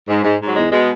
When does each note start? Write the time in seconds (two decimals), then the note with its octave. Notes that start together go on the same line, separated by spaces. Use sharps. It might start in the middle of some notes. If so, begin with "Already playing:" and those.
0.09 G#2
0.24 G#2
0.40 G#2
0.47 F#3
0.56 E2 G#3
0.72 B2 G#3